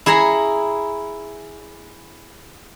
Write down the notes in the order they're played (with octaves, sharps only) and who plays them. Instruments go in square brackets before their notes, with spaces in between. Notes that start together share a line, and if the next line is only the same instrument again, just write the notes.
[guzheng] E4 G#4 C#5 A#5